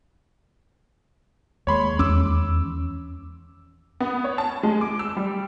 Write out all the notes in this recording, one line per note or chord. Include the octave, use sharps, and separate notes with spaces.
D#2 G#3 C#5 B5 C6
E2 C#4 D6 E6
B3
C#5
A5
G#3
D6
E6
G3